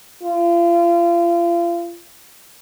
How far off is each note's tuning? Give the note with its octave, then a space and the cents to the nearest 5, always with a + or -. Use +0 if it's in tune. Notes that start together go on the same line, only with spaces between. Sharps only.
F4 -35